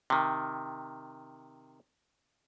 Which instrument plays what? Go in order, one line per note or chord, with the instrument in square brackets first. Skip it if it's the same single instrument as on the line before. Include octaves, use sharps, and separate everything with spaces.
[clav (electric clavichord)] C3 D#3